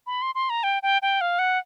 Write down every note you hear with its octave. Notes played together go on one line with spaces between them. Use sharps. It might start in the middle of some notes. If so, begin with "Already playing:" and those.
B5
C6
C6
A#5
G5
G5
G5
F5
F#5